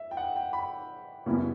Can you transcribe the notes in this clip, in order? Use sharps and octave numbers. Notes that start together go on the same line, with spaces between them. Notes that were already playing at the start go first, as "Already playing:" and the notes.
Already playing: E5
G5
F#5
G5
B5
F#2 C#3 G3 B3 E4